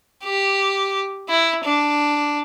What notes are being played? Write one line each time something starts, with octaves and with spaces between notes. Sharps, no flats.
G4
E4
D4